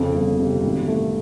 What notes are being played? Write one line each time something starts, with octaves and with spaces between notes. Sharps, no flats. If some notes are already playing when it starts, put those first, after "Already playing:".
Already playing: F2 C#3
G1
C3
G#1
A3